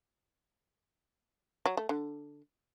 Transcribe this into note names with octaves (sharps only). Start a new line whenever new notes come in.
F#3
A3
D3